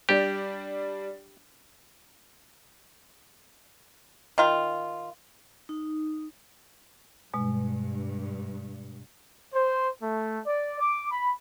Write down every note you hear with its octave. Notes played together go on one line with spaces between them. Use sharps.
G3 D4 G4
D#3 F4
D#4
G2 B2 G#3
C5
A3
D5
D6
B5